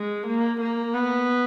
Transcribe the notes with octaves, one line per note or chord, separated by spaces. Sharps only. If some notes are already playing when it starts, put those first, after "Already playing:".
Already playing: G#3
A#3
A#3
B3